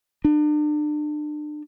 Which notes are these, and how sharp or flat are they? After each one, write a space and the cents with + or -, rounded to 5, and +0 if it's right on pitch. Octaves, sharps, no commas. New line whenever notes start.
D4 +35